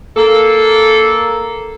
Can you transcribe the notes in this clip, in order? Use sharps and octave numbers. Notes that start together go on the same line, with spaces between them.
A#3 A4